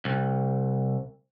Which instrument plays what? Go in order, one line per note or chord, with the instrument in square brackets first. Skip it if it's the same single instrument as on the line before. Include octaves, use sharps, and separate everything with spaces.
[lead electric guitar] C2